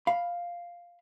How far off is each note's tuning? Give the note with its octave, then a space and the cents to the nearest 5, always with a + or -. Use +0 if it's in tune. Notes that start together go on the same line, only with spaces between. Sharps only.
F5 +0 B5 +0